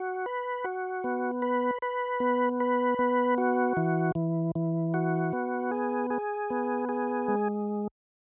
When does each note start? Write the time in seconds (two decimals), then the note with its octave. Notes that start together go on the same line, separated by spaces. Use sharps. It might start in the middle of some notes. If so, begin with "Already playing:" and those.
Already playing: F#4
0.26 B4
0.64 F#4
1.04 B3
1.42 B4
1.82 B4
2.20 B3
2.60 B4
2.99 B3
3.38 F#4
3.77 E3
4.15 E3
4.55 E3
4.94 F#4
5.33 B3
5.72 G#4
6.10 G#4
6.50 B3
6.89 G#4
7.28 G#3